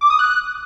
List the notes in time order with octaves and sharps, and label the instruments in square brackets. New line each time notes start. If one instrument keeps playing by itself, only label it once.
[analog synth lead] D6
D#6
F#6